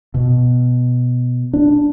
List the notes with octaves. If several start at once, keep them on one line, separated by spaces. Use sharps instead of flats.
B2
D4